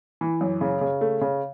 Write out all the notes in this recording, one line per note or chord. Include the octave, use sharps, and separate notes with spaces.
E3
F#2
C#3
C#3
A3
C#3